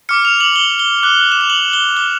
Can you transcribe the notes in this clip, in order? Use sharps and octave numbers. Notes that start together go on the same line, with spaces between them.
D6 F6 C#7
F7
F#7
G7
G7
D6 F#6
E7
F7
F#7
G7
D6 F6 G7